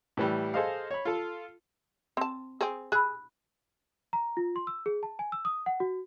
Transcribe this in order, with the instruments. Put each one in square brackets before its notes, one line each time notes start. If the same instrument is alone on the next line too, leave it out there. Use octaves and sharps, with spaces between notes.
[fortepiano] A2 E3 G3
G#4 A4 C5 D#5 F5
C#5 B5
F4 A4
[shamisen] C4 A5 [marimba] C6
[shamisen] C4 G#4
[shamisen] G#4 [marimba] B5 E6 F#6
[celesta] A#5
F4
C6
E6
G#4
A5
G#5
E6
D#6
F#5
F#4